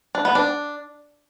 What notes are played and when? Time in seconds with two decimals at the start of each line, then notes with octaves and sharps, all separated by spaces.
0.15 D4
0.25 B3
0.35 D4